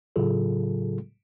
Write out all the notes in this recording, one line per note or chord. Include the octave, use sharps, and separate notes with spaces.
A2 C#3 F#3 F4 G#4 A4